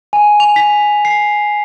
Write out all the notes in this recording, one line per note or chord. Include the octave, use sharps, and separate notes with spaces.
G#5
F7
B6
C7